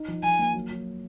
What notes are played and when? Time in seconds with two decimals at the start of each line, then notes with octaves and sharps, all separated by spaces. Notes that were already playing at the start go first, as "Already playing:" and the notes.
Already playing: D#4
0.08 F3
0.23 F3 G#5
0.39 A#3
0.54 F#3
0.70 F#3